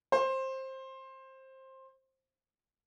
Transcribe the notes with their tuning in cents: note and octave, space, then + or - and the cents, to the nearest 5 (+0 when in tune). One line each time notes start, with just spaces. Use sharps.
C5 +15